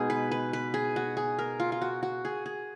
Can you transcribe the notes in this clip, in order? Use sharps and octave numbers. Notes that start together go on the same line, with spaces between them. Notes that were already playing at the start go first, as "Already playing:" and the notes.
Already playing: B2 G#3 B3 D#4 G#4
B4
B4
B4
G#4
F#4
G#4
A#4
F4
F4
F#4
F#4
G#4
G#4